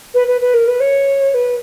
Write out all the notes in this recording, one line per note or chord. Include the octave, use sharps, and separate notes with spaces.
B4
B4
B4
A#4
B4
C#5
B4